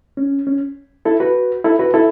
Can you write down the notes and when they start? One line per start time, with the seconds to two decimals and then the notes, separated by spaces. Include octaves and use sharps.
0.17 C#4
0.47 C#4
1.05 E4 A4
1.20 F#4 B4
1.64 E4 A4
1.79 F#4 B4
1.94 E4 A4